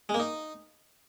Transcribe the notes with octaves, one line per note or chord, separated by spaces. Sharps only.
G#3
A#3
D#4